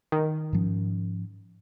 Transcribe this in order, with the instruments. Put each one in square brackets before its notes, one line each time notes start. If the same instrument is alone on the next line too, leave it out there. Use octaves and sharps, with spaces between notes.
[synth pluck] D#3
[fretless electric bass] G#2 F3 C#4